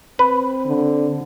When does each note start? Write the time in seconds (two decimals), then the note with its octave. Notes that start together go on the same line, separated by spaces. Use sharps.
0.19 C4 B4
0.66 D3